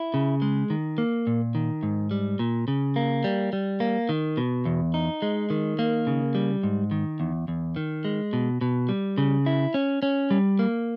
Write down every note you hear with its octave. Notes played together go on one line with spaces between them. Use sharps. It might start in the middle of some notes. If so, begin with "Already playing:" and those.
Already playing: E4
C#3
G#3
D#3
A#3
A#2
D#3
G#2
G3
A#2
C#3
A#3
G3
G3
A#3
D#3
B2
E2
D#4
G#3
D#3
A#3
C#3
G3
G#2
D#3
E2
E2
D#3
G#3
B2
B2
G3
C#3
E4
C#4
C#4
G3
A#3